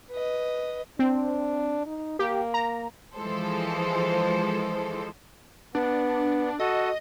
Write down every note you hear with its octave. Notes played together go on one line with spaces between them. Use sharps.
B4 D#5
C4 D4
D#4
A#3 G4
A#5
E3 F3 G#3 A4 C5
B3 D4
F#4 A4 D#5